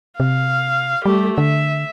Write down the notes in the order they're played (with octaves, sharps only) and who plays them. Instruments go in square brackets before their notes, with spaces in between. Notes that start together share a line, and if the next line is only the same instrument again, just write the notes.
[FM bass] C3 [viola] F5
[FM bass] G3 [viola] A3 G4
[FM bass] D3 [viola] E5